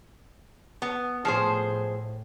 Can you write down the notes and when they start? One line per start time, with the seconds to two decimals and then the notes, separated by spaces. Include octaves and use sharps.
0.82 B3
1.25 A2 F3 G#4 C5